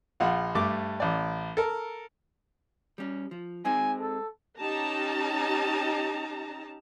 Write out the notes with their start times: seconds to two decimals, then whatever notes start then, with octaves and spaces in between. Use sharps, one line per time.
0.20 A#1 F4 F#5
0.55 G2 A3 D6
1.00 A1 D5
1.57 A4 A#4
2.98 G3 C#4
3.31 F3
3.65 G#3 C4 D#4 G#5
4.00 A4
4.59 C#4 D#4 G4 A5 A#5